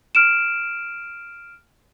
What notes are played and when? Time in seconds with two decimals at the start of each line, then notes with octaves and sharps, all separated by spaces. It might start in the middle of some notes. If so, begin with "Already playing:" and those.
0.15 F6 D7 E7